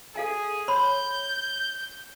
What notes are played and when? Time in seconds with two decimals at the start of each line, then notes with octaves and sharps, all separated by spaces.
0.16 G#4 A4 F5 G#5
0.68 C#5 B5 C6 G6